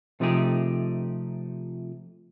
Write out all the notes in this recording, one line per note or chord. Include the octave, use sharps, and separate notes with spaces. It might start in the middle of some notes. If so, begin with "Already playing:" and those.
C3 F3 A3 D#4 G4 G#4